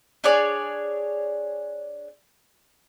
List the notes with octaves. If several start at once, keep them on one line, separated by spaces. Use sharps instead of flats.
D4 G#4 C#5 D5